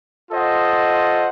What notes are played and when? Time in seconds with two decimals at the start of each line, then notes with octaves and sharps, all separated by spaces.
0.30 F4 A4 C5 D#5 F#5